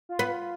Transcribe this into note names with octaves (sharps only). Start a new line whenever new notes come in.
F4
B3
F4